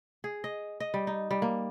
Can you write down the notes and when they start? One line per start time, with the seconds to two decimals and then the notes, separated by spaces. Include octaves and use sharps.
0.24 G#4
0.44 D#5
0.80 D#5
0.94 G3
1.07 D#4
1.31 G3
1.42 A#3